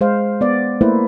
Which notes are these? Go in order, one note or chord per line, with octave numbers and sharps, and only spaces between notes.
G#3 C5 F5
B3 D5
A3 A#3 E4 B4 C5